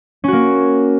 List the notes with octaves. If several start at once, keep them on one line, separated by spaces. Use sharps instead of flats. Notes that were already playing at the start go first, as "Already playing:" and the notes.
A#3 C#4 F#4